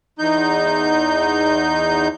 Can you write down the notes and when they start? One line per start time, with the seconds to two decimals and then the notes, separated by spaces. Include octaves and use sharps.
0.19 E2 D#4 G6